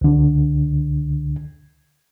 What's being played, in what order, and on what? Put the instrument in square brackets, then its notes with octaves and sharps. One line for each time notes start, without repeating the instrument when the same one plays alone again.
[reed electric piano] C#2 D3